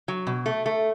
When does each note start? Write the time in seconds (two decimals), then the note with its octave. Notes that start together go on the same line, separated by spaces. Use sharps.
0.08 F#3
0.27 B2
0.46 A3
0.66 A3